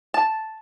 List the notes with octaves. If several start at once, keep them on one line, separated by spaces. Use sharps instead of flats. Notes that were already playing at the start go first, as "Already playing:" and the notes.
A5